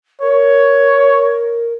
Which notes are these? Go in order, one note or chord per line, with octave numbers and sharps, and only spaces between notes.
A#4 C#5